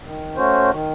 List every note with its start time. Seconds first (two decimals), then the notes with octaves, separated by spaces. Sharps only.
0.04 D#3
0.37 A3 C#4 F#4 C5
0.71 D#3